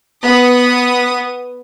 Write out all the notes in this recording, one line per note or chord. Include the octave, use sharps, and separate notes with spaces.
B3 D#6